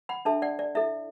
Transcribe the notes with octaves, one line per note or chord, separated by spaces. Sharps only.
F#5 B5
D4 A4 E5 A5
D5 F#5
D5
E4 A4 E5